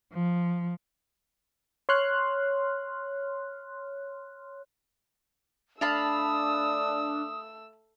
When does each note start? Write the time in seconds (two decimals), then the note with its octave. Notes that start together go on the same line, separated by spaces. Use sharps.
0.13 F3
1.89 C#5 C6 F6 F#6
5.81 A3 D4 F5 A5 B5 D#6 E6